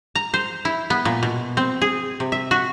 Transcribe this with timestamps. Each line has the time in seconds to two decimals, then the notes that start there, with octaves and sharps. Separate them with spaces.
0.15 A#5
0.34 C5
0.65 E4
0.90 B3
1.05 A#2
1.23 B2
1.57 C4
1.82 G#4
2.20 C3
2.32 E5
2.51 F#4